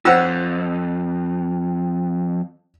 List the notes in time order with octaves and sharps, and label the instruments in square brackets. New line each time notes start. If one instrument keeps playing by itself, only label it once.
[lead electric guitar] F2 [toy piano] F4 C5 [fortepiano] F#5 E6